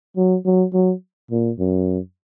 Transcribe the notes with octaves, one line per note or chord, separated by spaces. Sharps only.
F#3
F#3
F#3
A#2
F#2